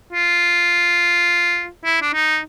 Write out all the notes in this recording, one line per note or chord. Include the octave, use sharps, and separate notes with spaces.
F4
E4
D4
D#4